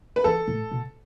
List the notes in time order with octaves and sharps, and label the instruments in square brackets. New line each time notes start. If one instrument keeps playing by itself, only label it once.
[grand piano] B4
[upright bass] E3 [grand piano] A4
[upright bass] A2
B2